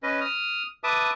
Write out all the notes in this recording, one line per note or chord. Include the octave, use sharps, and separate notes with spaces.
C#4 B4 D#5
D#6 F6
B4 E5 A5 D6 D#6